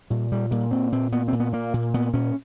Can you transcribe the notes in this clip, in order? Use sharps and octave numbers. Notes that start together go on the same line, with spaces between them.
A#2 G3
A#2 G3
A#2 G3
A#2 C4
A#2 C4
A#2 B3
A#2 C4
B3
A#2 A#3
A#2
A#2 B3
A#2 C#4